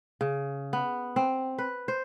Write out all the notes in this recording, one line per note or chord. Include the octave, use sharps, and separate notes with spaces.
C#3
B3
C4
B4
C5